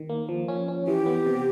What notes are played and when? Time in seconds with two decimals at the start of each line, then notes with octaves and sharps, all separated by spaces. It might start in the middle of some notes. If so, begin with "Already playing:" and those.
Already playing: D#3
0.09 A#3
0.29 F3
0.48 C#4
0.68 C#4
0.87 E3 G4
1.06 B3
1.26 C3